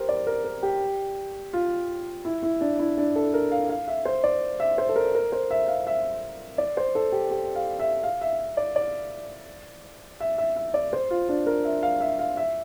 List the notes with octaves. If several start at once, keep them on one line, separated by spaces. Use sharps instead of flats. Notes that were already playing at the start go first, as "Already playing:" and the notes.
Already playing: G4 A#4 C5
D5
A#4
A#4
G4
F4
E4
E4
D4
E4
D4
A4
A#4
F5
F5
E5
C5
D5
E5
C5
A4
A#4
A#4
C5
E5
F5
E5
D5
C5
A4
G4
G4
F5
E5
F5
E5
D5
D5
E5
E5
E5
D5
C5
F4
D4
A#4
E5
F5
E5
F5
E5